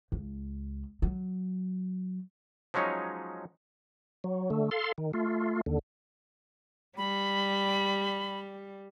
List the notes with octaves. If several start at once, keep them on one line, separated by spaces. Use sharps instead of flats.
C#2
F#3
F3 F#3 G#3 C#4 D#4 C#5
F#3
D3 A3
A4 F5 C6
D#3
A3 F4
D#2 D3
G3 B5